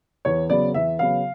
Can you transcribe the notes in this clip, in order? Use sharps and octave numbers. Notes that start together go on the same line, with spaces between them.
E2 C#5
C#3 F#3 B3 D5
E2 E5
C#3 F#3 B3 F5